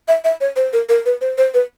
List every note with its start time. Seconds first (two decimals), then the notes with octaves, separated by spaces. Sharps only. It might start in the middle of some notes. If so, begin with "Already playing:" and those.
0.08 E5
0.24 E5
0.41 C#5
0.56 C5
0.73 A#4
0.89 A#4
1.06 B4
1.21 C5
1.38 C5
1.54 B4